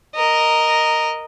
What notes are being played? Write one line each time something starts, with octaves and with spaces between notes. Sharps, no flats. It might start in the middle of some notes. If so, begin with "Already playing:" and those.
A#4 D#5